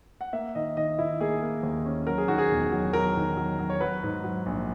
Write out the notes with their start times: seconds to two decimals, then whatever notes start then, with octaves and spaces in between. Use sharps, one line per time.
0.21 F#5
0.33 A#3 E5
0.55 D#3 D#5
0.77 D#3 D#5
0.99 D#3 E4
1.21 A#3 G#4
1.43 A#3
1.63 D#2
1.86 C#4
2.07 F#3 A#4
2.18 G#4
2.28 D#3 F#4
2.38 G#4
2.51 E1
2.72 F#3
2.93 F#3 A#4
3.16 D#3
3.37 F#3
3.59 F#3
3.70 C#5
3.81 F#3 B4
4.03 G#2
4.24 F#3
4.46 A#1